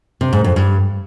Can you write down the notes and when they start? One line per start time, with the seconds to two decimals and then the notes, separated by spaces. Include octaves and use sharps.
0.21 C3
0.33 G#2
0.44 F2
0.56 G2